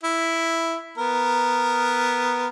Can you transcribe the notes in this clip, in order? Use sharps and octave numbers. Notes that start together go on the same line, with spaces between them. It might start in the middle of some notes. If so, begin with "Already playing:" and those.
E4
B3 A#4